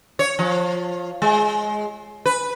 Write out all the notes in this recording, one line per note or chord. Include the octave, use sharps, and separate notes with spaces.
C#5
F3
G#3
B4